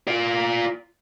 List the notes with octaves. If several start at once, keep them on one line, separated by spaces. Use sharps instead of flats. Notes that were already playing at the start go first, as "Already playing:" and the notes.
F4 D5